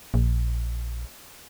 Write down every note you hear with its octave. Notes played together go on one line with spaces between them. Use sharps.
A#1